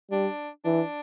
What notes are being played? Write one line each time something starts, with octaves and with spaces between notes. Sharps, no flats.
G3 D4
E3 D4